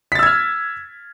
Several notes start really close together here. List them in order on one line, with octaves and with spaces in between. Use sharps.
B6 A6 E6 G#6 F6